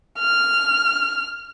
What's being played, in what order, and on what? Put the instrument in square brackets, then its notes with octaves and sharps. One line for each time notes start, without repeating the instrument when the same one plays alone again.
[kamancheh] F6